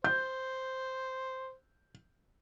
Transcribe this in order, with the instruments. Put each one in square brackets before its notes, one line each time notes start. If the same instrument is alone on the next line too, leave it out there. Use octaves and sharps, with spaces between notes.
[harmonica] C5 [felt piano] G6